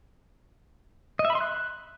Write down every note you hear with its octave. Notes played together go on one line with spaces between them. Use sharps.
D#5
E5
B5
C6
F#6